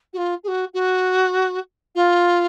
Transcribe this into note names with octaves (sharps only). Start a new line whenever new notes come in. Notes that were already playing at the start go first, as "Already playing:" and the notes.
F#4
F4
G#4
F#4
F#4
F4